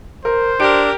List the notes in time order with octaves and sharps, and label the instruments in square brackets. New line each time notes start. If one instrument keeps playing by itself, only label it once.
[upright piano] A#4 [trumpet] C5
[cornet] D4 [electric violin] G4 A#4 [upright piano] D7